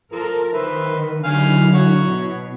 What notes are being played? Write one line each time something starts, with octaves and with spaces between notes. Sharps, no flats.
F3 A4 A#4
D#3 B4 C5 E5
D3 D#3 F#3 E4 F5 G#5
F#4 C#5 F#5
B2